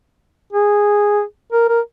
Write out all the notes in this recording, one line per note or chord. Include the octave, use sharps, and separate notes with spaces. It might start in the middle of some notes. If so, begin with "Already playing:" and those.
G#4
A#4
A#4